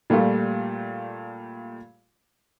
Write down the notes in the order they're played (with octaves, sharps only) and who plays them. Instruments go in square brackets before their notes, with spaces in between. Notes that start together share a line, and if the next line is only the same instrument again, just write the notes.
[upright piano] A#2 G3 A3 F4